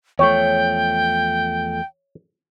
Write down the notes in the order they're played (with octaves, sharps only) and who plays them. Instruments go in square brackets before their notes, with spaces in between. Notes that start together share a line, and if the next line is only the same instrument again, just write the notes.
[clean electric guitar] E2 F3 A3 [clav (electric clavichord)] C#5 [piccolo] G5